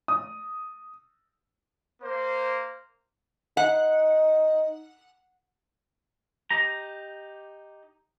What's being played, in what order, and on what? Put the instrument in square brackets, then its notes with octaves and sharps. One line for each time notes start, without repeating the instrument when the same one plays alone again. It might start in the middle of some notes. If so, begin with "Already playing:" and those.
[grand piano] D#6
[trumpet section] A#3 C5
[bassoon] D#4 [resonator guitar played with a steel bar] F#5
[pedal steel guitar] D#4 G4 A#5